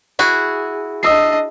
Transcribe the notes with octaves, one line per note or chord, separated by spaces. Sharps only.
E4 F#4 G#4
D4 D#5 D#6 E6 C7